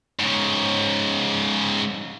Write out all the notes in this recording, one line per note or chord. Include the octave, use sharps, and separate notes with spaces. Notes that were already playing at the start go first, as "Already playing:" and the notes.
G#2 C#3